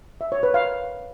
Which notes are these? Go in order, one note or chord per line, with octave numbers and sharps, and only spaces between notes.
E5
C#5
B4
F5